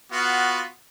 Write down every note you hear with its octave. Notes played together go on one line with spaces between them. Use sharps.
B3 F4 F#4